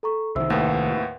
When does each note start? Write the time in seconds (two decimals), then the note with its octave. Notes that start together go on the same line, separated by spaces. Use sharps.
0.03 A4 A#5 C#6
0.36 C2 D#3 C5 E5 E6
0.50 D#2 A2 B4 F5 F#5